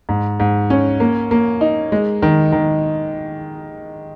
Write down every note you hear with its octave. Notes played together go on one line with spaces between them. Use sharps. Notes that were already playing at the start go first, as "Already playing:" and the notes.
G#2
G#2
C#4
A#3
A#3
D#4
G#3
D#3
D#3